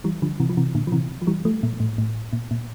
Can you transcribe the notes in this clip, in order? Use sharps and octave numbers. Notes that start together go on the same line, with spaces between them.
E3 G3
D3 F3
C3 E3
F3
C3 E3
A#2 D3
F3
C3 E3
F3
E3 G3
F3 A3
A#2
A2
A2
A#2
A#2